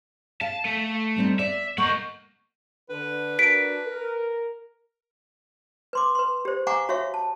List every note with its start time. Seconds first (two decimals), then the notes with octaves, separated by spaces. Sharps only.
0.41 F5 A5
0.65 A3 E5
1.16 G3 C4 D#4
1.39 D5 E5
1.78 A#3 A#4 D#5 F#5 C#6 G6
2.90 D3 B4
3.39 D4 F#4 A#4 B6 D7
3.87 A#4
5.93 B4 C6 D6
6.15 B4 C6
6.45 G4 C5
6.67 F5 F#5 G#5 A#5 C#6 D6
6.89 F#4 C#5 E5 F5 C#6
7.14 A5